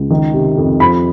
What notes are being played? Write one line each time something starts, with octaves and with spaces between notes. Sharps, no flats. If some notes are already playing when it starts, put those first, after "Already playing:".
Already playing: C#2
D#3
C3
F2
F3 B5